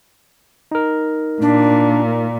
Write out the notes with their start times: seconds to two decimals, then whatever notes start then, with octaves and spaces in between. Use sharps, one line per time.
0.71 D#4 A#4
1.42 A#2 D4